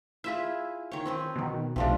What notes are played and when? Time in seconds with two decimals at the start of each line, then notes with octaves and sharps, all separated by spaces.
0.24 E4 F4 G#4 E5
0.91 D#3 C#5
1.06 C4 C#4 B4
1.36 B2 D#3
1.76 B1 C3 F3 A3 D4